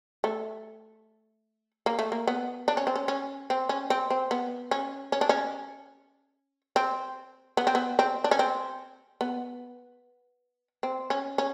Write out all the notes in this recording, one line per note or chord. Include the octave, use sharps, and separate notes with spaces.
A3
A#3
A3
A#3
B3
D4
C#4
C4
C#4
C#4
C4
C#4
C4
C4
B3
C#4
C#4
D4
C#4
C4
B3
C4
B3
C4
D4
C#4
C4
B3
C4
C#4
C#4